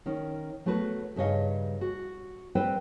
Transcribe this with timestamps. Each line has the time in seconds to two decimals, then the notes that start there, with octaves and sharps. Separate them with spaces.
0.06 D#3 C#4
0.66 F#3 A3 B3 F#4 B4
1.16 G2 C#3 D#4 C#5 D#5 F5
1.81 F#4
2.55 G3 C4 B4 C5 G5